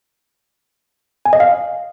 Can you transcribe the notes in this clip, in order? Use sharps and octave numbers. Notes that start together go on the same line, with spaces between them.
G#5
D#5
F5